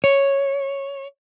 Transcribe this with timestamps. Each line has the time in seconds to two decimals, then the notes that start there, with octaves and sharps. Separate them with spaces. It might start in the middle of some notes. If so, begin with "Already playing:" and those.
0.04 C#5